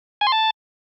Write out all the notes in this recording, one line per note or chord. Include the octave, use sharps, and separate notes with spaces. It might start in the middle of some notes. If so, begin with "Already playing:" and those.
G#5
C6
A5